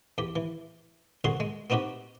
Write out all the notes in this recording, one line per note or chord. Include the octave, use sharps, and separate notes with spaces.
E2 G4
E3
C2 D3 F#4 G#4 C6
G#3
B3 C4 D#4 F#4 G4